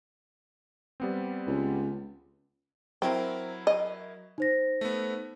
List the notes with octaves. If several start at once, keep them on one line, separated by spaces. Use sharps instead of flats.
G3 B3 C4
C#2
F#3 C4 E4 A#4
D#5
D#4 C5 A#6
A3 B3